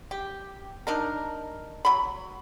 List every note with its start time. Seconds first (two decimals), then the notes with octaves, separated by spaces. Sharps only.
0.11 G4
0.87 D4 D#4 A#4
1.85 F#3 B5